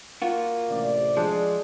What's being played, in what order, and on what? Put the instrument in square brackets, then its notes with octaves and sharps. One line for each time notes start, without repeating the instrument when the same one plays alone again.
[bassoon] A#3 [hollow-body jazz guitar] F4 F#4
[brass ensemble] A1 C3 D5
[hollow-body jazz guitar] F3 [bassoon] G#3 [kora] D4